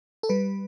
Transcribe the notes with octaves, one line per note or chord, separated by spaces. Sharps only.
A4
G3 B4